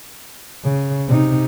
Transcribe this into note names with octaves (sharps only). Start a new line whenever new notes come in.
C#3
C3 D#4